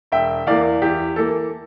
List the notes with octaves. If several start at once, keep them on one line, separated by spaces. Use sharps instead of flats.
E1 E5 G5
E2 E3 A#3 D5 F5
E2 G4
E3 A#3 A4